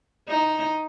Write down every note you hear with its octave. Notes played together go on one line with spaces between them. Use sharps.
D#4